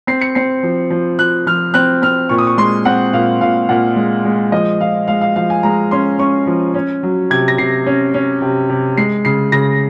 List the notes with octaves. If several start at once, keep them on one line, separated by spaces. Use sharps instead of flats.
C4 C7
C#7
C4 C7
F3
F3
F3 F#6
F3 F6
C4 F#6
C4 F6
A#2 C#6
D#6
C#6
G#3 C6
C4 F#5
A#2 F5
A#2 F5
A#2 F#5
G#3
G#3
F3 D#5
F3 F5
G#3 F5
F5
F3 F5
G#5
G#3 A#5
C#4 C6
C#4 C#6
F3
C#4
F#3
C3 G#6
A#6
C3 C7
C#4
C#4
C3
C3
G#3 C7
C#3 C7
C#3 A#6